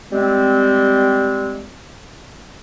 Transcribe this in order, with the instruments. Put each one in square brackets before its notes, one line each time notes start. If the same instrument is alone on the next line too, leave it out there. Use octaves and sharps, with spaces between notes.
[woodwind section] G3 G#3 C4